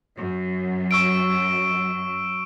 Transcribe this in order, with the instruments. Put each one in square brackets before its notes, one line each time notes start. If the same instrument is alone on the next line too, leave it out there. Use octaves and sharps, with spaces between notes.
[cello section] F#2
[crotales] C#6 E6 D7